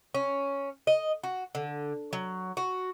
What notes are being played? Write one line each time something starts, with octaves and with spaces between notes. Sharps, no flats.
C#4
D#5
F#4
D3
F#3
F#4